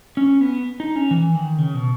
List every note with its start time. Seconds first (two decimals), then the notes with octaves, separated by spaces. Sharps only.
0.17 C#4
0.41 B3
0.80 D#4
0.96 C#4
1.11 E3
1.35 D#3
1.58 C#3
1.74 B2